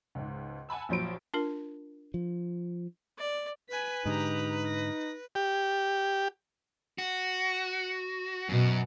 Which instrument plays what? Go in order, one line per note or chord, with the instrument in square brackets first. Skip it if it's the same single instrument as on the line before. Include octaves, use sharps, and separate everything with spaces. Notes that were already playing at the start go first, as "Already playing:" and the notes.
[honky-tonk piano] C#2 G#2
F#5 G#5 A5 B5 E6
A#1 F3 F#3 C5 B5 D7
[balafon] D4 F4 A#4
[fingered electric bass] F3
[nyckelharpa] D5
[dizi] B4 [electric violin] G#5 B6
[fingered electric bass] G#2 D3 [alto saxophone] D#4 [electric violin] G4 A#5
[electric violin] A#6
[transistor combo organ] G4
[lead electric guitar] F#4
[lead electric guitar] F#2 [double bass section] B2